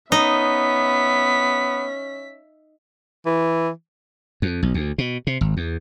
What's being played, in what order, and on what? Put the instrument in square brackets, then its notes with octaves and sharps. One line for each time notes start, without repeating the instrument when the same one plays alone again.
[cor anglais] B3 [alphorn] C#4 [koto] D#4 [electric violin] E5 B6
[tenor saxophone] E3
[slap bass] F2
B1
D2
B2
C3
G#1
E2